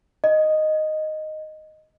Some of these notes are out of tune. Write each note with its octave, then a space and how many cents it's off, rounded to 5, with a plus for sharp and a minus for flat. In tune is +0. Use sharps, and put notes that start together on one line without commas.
D#5 -5